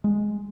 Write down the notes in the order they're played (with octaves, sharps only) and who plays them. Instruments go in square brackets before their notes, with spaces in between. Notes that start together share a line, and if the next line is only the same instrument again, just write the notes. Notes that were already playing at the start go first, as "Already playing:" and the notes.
[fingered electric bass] G#3